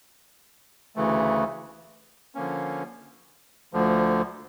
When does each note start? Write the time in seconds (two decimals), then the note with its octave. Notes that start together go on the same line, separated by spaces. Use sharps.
0.96 D2 C#3 E3 A3
2.35 D3 F3 A#3 C#4
3.73 D2 D3 F3